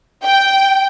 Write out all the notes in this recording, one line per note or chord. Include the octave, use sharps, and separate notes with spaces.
G5